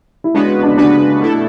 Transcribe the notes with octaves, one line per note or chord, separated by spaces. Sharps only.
E4
C#3 G#3 B3 D4 F#4 B4
D4
C#3 G#3 B3 D4 F#4 B4
B2 A3 E4 A4